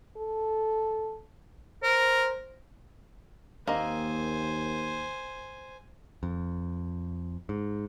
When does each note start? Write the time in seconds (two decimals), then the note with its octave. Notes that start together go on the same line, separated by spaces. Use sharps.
0.17 A4
1.83 A#4 C5
3.67 D#2 A#3 C4 C5 D#5 G#5
6.23 F2
7.49 G#2